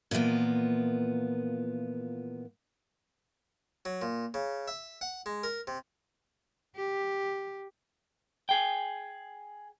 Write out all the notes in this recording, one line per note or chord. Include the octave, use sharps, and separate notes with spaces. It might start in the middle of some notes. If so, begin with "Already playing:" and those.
A#2 E3 F3 A#3 B3
F#3
A#2
C#3
E5
F#5
G#3
A#4
C3
G4
G#4 G5